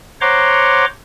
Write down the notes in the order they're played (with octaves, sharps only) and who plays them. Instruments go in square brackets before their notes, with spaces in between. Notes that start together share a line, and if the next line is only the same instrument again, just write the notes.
[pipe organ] C5 C#5 F#5 A#5 C6 D6